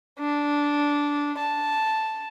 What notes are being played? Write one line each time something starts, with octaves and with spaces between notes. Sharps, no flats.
D4
A5